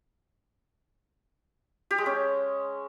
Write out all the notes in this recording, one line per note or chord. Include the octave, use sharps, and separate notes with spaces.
G4
G#3
C#4